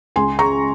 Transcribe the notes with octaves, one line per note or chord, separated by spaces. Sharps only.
C#2 G#5 C6
C#3 A#5 C#6